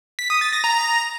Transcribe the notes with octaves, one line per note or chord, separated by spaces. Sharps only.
B6
D#6
A6
A#6
A#5